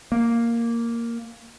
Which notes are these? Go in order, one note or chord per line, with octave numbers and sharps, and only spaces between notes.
A#3